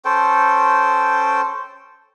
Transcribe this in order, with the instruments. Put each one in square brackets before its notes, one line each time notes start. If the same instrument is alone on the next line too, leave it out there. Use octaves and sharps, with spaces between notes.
[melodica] C#4 A4 C5 G5